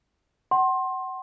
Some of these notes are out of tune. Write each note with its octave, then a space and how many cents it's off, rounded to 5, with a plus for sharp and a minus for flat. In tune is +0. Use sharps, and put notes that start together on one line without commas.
F#5 +30 C6 +20